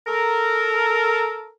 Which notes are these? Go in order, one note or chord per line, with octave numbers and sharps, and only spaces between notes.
A4 A#4